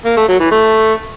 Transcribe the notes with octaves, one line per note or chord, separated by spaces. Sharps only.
A#3
A3
F#3
E3
A3